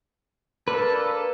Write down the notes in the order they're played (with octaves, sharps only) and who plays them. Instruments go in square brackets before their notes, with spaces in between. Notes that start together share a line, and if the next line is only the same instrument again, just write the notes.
[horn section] A#3 D4 A4 [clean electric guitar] B4